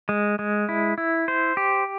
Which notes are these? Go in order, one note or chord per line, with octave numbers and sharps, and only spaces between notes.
G#3
G#3
E4
E4
C5
G4